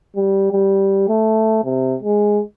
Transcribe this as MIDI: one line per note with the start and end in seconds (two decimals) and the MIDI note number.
0.16 0.48 55
0.52 1.06 55
1.09 1.64 57
1.65 1.96 48
2.02 2.42 56